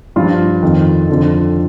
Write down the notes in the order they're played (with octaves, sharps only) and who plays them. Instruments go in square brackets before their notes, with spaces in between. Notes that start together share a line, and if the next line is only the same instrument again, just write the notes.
[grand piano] G2 F3 F4
F2 D#3
F2 D3 F3